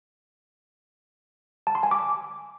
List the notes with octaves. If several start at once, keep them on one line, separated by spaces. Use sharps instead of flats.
A5
C6
G#5
D6